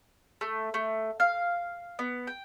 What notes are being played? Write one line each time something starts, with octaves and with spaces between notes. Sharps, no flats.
A3
A3
F5
B3
G5